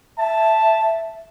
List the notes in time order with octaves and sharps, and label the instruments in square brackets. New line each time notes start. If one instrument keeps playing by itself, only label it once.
[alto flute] E5 [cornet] A5